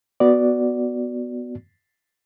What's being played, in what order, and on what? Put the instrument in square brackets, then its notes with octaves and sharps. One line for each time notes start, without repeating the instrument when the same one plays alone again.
[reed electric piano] B3 F#4 D5